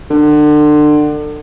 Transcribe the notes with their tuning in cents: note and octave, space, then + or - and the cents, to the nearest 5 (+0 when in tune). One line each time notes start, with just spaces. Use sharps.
D3 +30